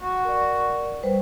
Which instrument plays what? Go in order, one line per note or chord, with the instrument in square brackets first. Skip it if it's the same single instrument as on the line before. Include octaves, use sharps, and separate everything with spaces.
[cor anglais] F#4
[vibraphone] A#4 D5
G3 B4 C5